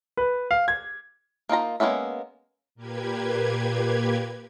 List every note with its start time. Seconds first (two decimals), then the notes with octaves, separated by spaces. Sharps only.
0.17 B4
0.51 F5
0.68 G#6
1.49 A#3 D#4 F4 A#5
1.80 G#3 A#3 B3 C#4 E5
2.75 A#2 A#3 G4 B4 G#6